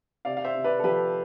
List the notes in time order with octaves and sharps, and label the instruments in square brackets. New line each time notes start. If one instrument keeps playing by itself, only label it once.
[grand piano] C3 D5 F5
F5
C5 E5
C3
B4 D5
A4
F3 G4 B4